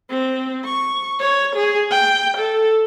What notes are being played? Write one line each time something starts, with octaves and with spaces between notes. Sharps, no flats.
C4
C#6
C#5
G#4
G5
A4